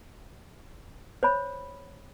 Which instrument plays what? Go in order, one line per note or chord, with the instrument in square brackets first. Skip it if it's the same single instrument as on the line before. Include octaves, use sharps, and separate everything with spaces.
[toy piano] C5 C#5 B5